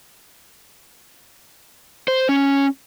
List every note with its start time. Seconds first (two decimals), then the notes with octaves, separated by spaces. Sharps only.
2.08 C5
2.29 C#4